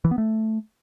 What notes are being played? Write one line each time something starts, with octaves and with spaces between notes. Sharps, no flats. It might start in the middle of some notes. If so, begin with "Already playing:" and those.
E3
B3
A3